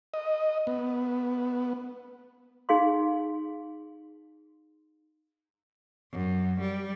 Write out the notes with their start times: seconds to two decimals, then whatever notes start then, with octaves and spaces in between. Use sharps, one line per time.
0.14 D#5
0.67 B3
2.69 D#4 G#4 F5 C6
6.12 F#2
6.60 G3